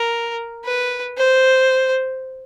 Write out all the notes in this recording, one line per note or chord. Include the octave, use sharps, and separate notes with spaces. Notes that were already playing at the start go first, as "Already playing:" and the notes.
Already playing: A#4
B4
C5